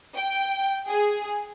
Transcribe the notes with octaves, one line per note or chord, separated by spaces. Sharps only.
G5
G#4